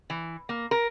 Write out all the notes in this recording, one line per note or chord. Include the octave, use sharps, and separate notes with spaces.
E3
A#3
A#4